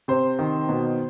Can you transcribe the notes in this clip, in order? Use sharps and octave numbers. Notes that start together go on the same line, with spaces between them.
C3 C5
D#3
B2